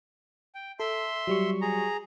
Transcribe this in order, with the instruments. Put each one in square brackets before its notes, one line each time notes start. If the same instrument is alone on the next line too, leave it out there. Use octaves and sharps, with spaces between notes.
[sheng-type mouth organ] G5
[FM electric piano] A4 [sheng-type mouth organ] E5 C6
[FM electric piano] F#3 G3 C#6
[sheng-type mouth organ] G#4 A#5